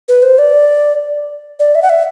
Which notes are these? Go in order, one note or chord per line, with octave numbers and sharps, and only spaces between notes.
B4
C5
D5
D5
E5
F#5
E5